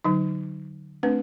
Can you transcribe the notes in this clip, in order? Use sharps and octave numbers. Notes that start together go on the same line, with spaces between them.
D3 F#3 D#4
A3 C4 D4 B4